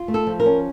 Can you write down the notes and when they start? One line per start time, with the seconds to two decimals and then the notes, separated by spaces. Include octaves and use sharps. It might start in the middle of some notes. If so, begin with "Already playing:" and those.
Already playing: F4
0.08 A3
0.14 A4
0.27 F3
0.40 A#4
0.46 C#4